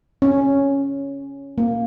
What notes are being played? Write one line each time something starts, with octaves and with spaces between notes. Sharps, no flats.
C#4
A#3